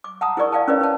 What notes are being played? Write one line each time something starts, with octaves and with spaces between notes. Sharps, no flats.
D6
F#5 A5 A#5 D#6
E4 G#4 A#4 D5 C#6
D5 F5 G5 A5
C#4 E4 A#4 B4 C#5 D5
C#4 B4 C#5 A5